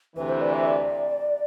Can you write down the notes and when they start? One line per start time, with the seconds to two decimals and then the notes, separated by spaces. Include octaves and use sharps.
0.16 D2 C3 E3 B4
0.29 C5
0.41 D5
0.54 E5
0.66 D5